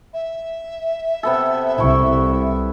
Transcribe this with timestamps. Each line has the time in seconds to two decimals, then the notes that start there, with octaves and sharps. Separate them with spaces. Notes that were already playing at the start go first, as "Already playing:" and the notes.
0.14 E5
1.23 C3 B3 A4
1.78 C2 E4 C#6